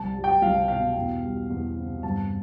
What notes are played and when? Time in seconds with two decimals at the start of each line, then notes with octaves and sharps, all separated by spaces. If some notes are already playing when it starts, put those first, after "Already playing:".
Already playing: C2 G3 A5
0.15 G3
0.24 G5
0.42 C2 F5
0.68 B2 F5
0.95 E2
1.23 G3
1.50 E2
1.77 C3
2.03 G2 A5